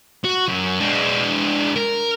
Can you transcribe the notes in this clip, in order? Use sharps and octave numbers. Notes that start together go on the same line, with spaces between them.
F#4
F#2
G#3 D4
A#4